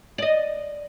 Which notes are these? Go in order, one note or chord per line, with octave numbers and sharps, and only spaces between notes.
D5 D#5